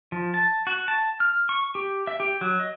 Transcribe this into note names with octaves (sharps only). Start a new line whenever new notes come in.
F3
A5
F#4
A5
F6
C#6
G4
E5
G4
F#3
D#5